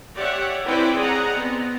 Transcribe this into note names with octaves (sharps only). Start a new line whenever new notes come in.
G4 C#5 D5 E5 F#5
C4 E4 B4 C5 D5 G5
G#4 D5 D#5 F#5 A#5
B3 C4